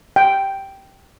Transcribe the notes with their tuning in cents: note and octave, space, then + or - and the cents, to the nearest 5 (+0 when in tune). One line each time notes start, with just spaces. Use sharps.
G5 -5